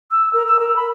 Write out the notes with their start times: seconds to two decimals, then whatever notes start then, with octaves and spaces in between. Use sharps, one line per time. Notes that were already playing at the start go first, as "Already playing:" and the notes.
0.11 E6
0.33 A#4
0.47 E6
0.59 A#4
0.76 B5